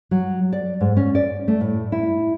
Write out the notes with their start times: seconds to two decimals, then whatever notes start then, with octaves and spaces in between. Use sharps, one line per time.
0.11 F#3
0.53 D5
0.81 G#2
0.97 C#4
1.15 D5
1.48 A3
1.61 A2
1.92 E4